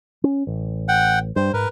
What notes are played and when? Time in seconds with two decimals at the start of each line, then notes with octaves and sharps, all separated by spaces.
0.24 C#4
0.47 A1
0.88 F#5 G5
1.36 G2 C5
1.53 G#2 A#4 B4